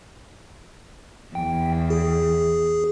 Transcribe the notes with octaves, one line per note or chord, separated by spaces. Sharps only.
E2 G5
G#4